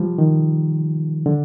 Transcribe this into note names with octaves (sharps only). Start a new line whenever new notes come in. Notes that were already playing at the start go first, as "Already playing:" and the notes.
Already playing: F3 G3
D#3
D3